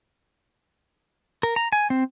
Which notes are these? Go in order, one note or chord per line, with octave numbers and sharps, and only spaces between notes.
A#4
A#5
G#5
C4